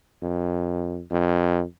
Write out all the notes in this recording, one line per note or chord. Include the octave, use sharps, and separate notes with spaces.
F2
F2